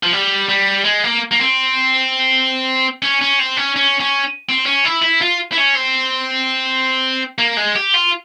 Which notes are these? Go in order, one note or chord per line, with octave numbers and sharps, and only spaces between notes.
F3
G3
G3
G#3
A#3
A#3
C4
C#4
C#4
C4
C#4
C#4
C#4
C4
C#4
E4
E4
F4
E4
C#4
C4
A#3
G#3
G4
F4